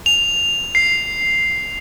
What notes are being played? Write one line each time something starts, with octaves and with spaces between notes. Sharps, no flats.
F7
C7